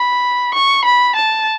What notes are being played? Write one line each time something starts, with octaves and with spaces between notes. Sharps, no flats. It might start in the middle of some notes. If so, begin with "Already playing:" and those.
Already playing: B5
C#6
B5
A5